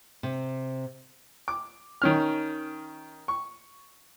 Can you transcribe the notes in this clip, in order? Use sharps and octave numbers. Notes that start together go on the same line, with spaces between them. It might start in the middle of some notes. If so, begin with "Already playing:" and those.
C3
D6
D#3 C#4 F6
C#6